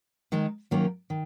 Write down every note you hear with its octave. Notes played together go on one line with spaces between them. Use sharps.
D#3 G#3 D#4
D#3 F#3 A#3 C#4
D#3